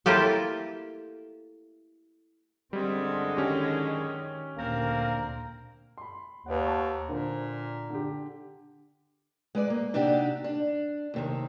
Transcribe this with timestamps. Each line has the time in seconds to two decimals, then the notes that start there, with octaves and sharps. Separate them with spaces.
0.06 A3 A#3 E4 F4 G4 A4
2.73 F#2 D3 G3 G#3 C4
3.37 D#3 C#4 G4
4.58 D2 A#2 A#3 C4 A#4
5.98 B5 C6
6.46 D#2 B4 D5 F#5
6.65 F#5 A5 C#6
7.09 A#2 D3 A#4 C5
7.90 D3 G4
9.55 G#3 B4 D5
9.70 A#3
9.94 C3 D4 D#4 F#4 G4
10.44 D4
11.14 D#2 C3 D#3